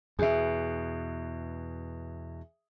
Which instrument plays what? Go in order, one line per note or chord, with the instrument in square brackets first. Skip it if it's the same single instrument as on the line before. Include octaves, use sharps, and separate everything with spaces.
[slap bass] E2 B2 [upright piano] G#4 E5